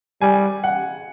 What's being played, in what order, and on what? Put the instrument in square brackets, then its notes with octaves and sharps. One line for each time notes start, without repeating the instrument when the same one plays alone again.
[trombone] G3 [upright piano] G#5
[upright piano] F#5